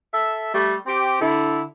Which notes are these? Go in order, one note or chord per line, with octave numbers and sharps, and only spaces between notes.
A4 E5
G3 A3
C4 G4
D3 E4